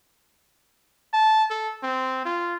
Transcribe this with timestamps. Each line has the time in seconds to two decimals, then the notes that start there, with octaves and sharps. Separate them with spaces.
1.14 A5
1.51 A4
1.83 C4
2.25 F4